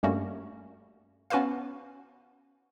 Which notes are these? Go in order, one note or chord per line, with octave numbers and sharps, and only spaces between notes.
G2 G3 A3 A#3 C#4 F#4
B3 C#4 F#4 B4 C5 F5